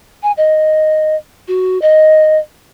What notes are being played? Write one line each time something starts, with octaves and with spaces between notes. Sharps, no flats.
G#5
D#5
F#4
D#5